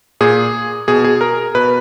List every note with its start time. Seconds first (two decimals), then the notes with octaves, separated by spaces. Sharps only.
0.21 A#2 G#4
0.88 B2 G#4
1.05 G#4
1.21 A#4
1.55 B2 B4